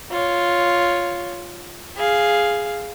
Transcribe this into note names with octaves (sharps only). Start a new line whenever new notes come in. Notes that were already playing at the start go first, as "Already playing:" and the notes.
F4 C#5
G#4 F5